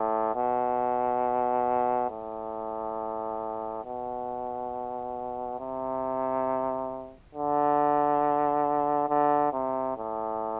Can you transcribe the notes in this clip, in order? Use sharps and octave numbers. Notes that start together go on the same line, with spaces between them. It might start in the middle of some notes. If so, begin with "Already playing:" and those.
Already playing: A2
B2
A2
B2
C3
D3
D3
C3
A2